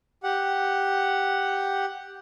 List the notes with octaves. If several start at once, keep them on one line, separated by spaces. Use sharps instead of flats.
G4 F#5